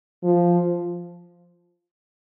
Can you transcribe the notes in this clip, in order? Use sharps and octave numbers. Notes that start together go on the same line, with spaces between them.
F3